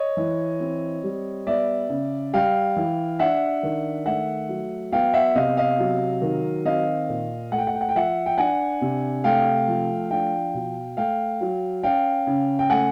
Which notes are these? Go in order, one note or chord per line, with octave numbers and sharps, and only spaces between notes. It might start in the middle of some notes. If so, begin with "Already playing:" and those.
Already playing: C#5 D#5
E3
C4
G3
B3 D5 E5
C#3
G3 F5 G5
E3
D4 E5 F#5
D#3
A3 E5 F#5
F#3
B3 F5 G5
E5 F#5
C3 D#5 F5
D#5 F5
F#3
D#3
C4 D#5 F5
A#2
A3 F#5
G5
F#5
G5
F#5
G5
F3 E5 F#5
G5
D4 F#5 G#5
C3
A3 F5 G5
F3
D4 F5 G5
B2
A3 F5 G5
F#3
C#4 F5 G5
C#3
G5
A3 F#5 G#5